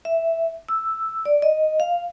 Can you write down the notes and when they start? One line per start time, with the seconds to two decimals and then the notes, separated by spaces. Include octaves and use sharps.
0.05 E5
0.69 E6
1.25 D5
1.42 D#5
1.80 F5